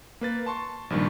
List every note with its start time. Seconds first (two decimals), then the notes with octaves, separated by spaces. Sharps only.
0.21 A#3 B4 A6
0.46 A5 C6 C#6
0.90 A#1 G2 D#3 G3